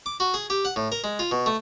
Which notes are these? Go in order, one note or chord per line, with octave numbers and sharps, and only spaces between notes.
D6
F#4
G#4
G4
F#5
A2
A#4
G#3
F4
B2
A3